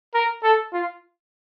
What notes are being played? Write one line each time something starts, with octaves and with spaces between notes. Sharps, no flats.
A#4
A4
F4